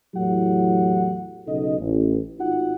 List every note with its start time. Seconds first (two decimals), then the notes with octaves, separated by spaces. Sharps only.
0.15 E2 A2 F#3 E4 G4 F#5
1.47 B1 C#3 D#4 A4 D#5
1.79 A1
2.40 G#1 D#4 F4 F#4 F#5